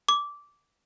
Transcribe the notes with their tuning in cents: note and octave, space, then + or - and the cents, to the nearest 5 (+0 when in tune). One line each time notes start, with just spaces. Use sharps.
D6 -15